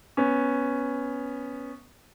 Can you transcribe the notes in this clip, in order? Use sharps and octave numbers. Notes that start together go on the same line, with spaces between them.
B3 C#4